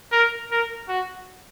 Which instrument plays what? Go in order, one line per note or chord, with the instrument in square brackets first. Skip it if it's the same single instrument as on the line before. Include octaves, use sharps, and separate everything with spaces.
[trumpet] A#4
A#4
F#4